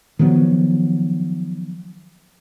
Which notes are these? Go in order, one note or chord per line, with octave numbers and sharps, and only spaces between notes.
D#3 F3 F#3 B3